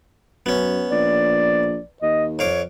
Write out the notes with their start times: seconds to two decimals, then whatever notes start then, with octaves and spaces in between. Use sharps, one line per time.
0.46 F#2 B3 C#4
0.91 A#1 D5
2.02 D#2 D#5
2.39 F2 C#5 F5 D6